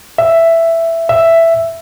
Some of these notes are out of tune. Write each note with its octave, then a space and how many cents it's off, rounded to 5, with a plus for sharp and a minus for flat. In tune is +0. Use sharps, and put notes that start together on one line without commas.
E5 +5
E5 +5